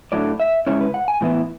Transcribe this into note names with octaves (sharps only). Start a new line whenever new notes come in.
A2 F#3 A3 D4 D5
E5
C#3 G#3 C#4 E4 C#5
B4
F#5
G#5
A2 E3 B3 E4